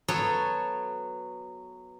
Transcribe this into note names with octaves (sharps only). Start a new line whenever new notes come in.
F#3 B3 A4 C#5